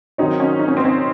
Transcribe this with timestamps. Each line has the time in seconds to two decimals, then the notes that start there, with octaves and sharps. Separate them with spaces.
0.18 D#3 F#3 C4 D#4 F#4 C#5
0.40 C#4
0.59 D#4
0.68 C#4
0.77 C4
0.85 C#4